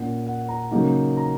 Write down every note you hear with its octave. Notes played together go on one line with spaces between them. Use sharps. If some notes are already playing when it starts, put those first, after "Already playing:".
Already playing: A#2 A#3 C#4 F#5
F#5
A#5
C#3 F#3 A#3 D#4
A#5